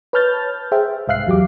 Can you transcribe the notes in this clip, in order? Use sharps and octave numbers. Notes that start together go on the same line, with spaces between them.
B4 C#5 A5 F6 G6 A6
G#4 C5 E5 G5
C2 G#2 E5 F5 F#6 C7
E2 F#3 G4 D6